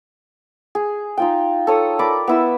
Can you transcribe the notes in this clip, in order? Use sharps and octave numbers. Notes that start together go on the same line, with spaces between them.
G#4
D#4 F4 G5
A4 C#5 D#6
A#4 D5 B5 D6
B3 E4 E6